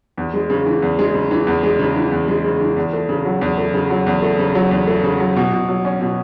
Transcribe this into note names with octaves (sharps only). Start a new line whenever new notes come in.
E2
G#3
C#3
E3
E2
G#3
C#3
E3
E2
G#3
C#3
E3
E2
G#3
C#3
E3
E2
A3
C#3
F#3
E2
A3
C#3
F#3
E2
A3
C#3
F#3
E2
A3
C#3
F#3
B2
B2
F#3
C#4
B2